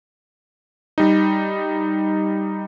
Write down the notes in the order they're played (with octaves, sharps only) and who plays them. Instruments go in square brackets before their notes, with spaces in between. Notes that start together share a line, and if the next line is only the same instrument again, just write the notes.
[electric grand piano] G3 D#4